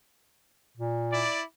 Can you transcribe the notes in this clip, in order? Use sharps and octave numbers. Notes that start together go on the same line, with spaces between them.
A#2
E4 D5